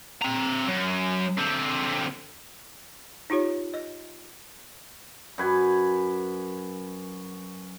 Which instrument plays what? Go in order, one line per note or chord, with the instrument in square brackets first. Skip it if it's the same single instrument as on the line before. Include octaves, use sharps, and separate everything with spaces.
[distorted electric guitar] C4 A#5
F#2
D3 C4
[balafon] D#4 F4 G4 C#5
D#5
[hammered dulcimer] F#2 B4 G#5